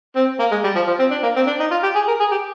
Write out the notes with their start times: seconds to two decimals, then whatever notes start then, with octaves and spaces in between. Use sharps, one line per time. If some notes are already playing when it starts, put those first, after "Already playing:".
0.16 C4
0.39 A#3
0.51 G#3
0.64 G3
0.75 F3
0.87 F3
0.99 C4
1.11 D4
1.23 A#3
1.36 C4
1.47 D4
1.60 D#4
1.71 F4
1.83 G4
1.95 G#4
2.08 A#4
2.20 G#4
2.31 G4